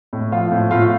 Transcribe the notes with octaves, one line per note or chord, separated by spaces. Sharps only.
A2
F3 F4 F5
A2
A2 F4 F5